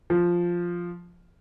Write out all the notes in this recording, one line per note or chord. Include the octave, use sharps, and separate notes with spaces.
F3